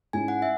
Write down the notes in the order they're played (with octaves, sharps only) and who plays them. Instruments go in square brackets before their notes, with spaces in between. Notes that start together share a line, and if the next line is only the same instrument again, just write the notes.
[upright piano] G#2 G#3 C#4 E4 [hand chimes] G#5
[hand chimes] F#5
E5